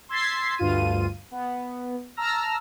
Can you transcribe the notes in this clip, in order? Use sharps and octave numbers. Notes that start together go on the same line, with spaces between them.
C6 E6 G#6 A6 B6 C7
D2 G2 F4 D#7
B3
A5 A#5 E6 F6 A#6